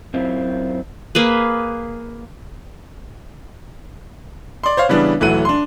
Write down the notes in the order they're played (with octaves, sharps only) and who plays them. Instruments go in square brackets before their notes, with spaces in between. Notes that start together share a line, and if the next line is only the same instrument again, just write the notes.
[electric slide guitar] F#2 C4 E4 F4
[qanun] A#3 G#4 B4
[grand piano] D5 C6
C5 C#5 F5
C#3 E3 G3 B3 D4
D#1 E3 F#3 A3 F#5 D#7
D4 C6